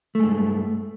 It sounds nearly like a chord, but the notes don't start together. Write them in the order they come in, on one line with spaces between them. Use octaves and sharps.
A3 G#3 G2